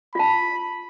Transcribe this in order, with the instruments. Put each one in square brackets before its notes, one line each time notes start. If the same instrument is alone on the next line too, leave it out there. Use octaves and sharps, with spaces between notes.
[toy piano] F4 A5 [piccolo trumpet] B5